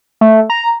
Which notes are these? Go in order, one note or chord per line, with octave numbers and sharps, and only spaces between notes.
A3
A#5